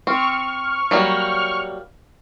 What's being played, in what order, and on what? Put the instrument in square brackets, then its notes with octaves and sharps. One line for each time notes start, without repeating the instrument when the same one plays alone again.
[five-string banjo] C4 [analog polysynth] C#6 F6
[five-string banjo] F#3 G3 A#3